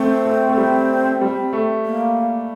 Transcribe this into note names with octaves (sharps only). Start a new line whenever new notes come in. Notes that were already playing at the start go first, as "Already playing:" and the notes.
Already playing: A3 C4
A3
A3
G3
G3
A3
A#3